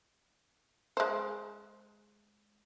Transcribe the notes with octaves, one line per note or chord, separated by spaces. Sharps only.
G#3 C5